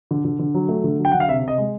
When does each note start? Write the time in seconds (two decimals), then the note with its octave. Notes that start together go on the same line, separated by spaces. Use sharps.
0.11 D3
0.25 D3
0.39 D3
0.55 F#3
0.69 A3
0.84 D3
0.99 F#3
1.05 G5
1.12 D3 F#5
1.20 F5
1.28 C3 E5
1.43 C3 D#5
1.58 G#3